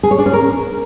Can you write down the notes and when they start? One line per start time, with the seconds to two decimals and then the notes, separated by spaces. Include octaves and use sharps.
0.03 G#4
0.11 C#5
0.18 D4
0.26 C#4
0.33 A#4